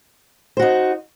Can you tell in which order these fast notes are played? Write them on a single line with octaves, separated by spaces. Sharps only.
C5 F#4 D#4